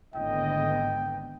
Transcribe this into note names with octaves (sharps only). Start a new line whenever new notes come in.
G#1 A2 D3 B3 D#5 G5